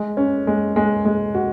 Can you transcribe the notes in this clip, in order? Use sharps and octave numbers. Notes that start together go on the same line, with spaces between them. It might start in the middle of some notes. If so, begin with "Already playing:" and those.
Already playing: G#3
C#4
G#3
G#3
G#3
F#4